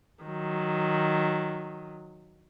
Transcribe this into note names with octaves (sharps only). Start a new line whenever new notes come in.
D#3 F#3